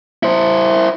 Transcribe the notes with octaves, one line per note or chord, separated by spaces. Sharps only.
E4 C5